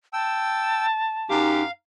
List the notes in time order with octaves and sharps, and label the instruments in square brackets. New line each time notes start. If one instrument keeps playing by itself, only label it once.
[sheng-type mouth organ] G5 E6 [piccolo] A5
[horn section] F#2 G4 [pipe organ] D#4 [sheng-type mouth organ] F5